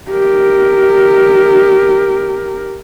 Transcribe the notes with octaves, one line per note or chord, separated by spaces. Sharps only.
G4 A#4